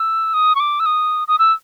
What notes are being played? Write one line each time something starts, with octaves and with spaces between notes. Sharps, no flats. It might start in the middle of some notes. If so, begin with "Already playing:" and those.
Already playing: E6
D#6
C#6
D6
E6
D#6
D#6
E6